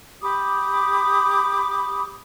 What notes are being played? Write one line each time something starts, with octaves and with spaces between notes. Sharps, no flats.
G4 B5 D6 D#6